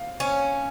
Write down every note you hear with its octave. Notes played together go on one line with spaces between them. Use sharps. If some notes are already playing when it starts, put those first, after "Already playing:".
Already playing: F5
C#4 C#5